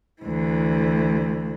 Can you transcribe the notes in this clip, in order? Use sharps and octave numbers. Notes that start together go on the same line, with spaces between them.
D2 E3